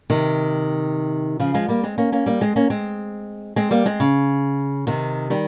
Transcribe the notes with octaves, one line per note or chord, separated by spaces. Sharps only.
C3 D#3
C#3 F3
F3 G#3
G3 A#3
G#3 C4
A#3 C#4
A#3 C#4
G3 A#3
G#3 C4
A#3 C#4
G#3 C4
G#3 C4
G3 A#3
G#3 C4
C#3
C3 D#3
D#3 G3